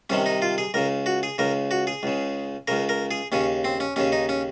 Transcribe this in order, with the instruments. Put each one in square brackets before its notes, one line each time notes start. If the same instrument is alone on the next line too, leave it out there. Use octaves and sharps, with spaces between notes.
[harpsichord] C2 C3 D#3 C#4
D#4
F4
G#4
C#2 C#3 A#4
F#4
G#4
C#2 C#3 A#4
F#4
G#4
C#2 C#3
C#2 C#3 A#4
A#4
G#4
D#2 C#3 C#4
C4
C#4
D#2 C#3 C#4
D#4
C#4